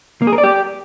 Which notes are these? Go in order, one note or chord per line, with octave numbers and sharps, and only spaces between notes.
A#3
G#4
A#4
D5
G4